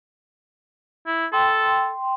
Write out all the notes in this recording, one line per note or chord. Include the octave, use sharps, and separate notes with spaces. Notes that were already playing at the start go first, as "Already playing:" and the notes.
E4
A4 G5 C6